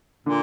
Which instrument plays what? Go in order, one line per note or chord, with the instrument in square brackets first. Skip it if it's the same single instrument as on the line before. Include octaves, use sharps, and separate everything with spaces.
[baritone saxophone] A#2 [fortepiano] D3